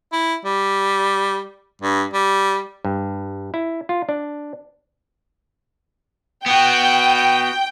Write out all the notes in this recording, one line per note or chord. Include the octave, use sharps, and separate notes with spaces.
E4
G3
G2
G3
G2
E4
F4
D4
B3 F#4 G5